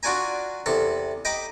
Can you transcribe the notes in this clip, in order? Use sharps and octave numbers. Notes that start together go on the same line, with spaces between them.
D4 F4 F#4 D5 G#5 A#5
E2 C3 A4
D#5 G5 A#5 B5 D6